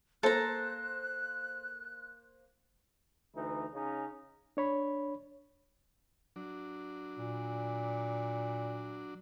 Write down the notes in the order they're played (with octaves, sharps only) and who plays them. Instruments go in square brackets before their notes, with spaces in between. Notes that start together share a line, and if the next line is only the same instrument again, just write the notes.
[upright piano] A#3 C5 [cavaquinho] A4 A#5 [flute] F#6
[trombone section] D2 E3 D#4
C#3 C#4 D#4
[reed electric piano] D4 C#5 B5
[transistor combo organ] F#3 D4
[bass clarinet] A#2